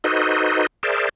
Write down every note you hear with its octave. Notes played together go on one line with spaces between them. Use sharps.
D#4 F#4 A4 B4 C5 D#5
G#4 A#4 C5 D5 E5